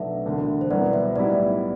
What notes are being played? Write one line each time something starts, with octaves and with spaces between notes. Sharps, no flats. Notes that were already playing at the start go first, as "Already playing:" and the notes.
Already playing: B1 B2 F#3 A3 D4 E5
E1 D2 D3
C5
C2 B2 F#3 B3 F#4 D5
E5
B1 A2 G3 B3 E4 D5